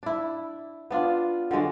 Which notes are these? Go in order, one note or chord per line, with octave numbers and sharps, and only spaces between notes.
D4 E4
B3 D4 F4
D3 F#3 G#3 D4